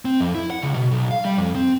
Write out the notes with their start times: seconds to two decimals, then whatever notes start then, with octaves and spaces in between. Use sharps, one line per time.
0.05 C4
0.20 F2
0.35 E4
0.50 F#5
0.62 C#2
0.75 B2
0.91 B1
1.11 F5
1.25 G3
1.37 F2
1.55 C4